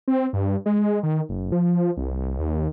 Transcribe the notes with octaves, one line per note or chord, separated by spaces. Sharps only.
C4
G2
G#3
G#3
D#3
F#1
F3
C2
D#2